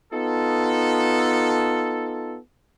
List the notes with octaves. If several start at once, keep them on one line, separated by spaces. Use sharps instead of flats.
B3 D#4 F4 A4